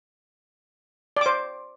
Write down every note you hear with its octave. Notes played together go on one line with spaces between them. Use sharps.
C5 D5 D6